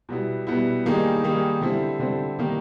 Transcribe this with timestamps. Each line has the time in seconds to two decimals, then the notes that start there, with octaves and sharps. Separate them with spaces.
0.09 B2 G3 B3 E4
0.47 B2 G3 B3 E4
0.86 D#3 G3 A#3 D#4 G#4
1.24 D#3 G3 A#3 D#4 G#4
1.61 D3 G3 C4 E4
1.99 D3 G3 C4 E4
2.39 D#3 G3 A#3